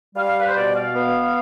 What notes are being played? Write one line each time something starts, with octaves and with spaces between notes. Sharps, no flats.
G3 F5
B4
C5
B2 D5
F5
B3